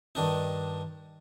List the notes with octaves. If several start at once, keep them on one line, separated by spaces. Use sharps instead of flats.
G2 D#3 D4 D#4